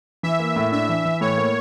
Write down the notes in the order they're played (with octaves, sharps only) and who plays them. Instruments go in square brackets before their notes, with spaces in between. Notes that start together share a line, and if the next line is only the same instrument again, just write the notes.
[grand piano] E3 [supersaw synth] E5
[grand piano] A#3
A2
[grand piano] D4 [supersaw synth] E5
[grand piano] E3
E3
[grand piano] A2 [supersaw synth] C#5
[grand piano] A#3